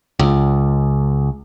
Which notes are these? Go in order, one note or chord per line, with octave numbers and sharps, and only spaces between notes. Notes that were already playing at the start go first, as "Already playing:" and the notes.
C#2